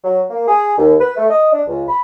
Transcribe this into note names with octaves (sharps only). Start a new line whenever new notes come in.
F#3
A#3
G#4
D#2
B4
A3
D#5
D4
C#2
B5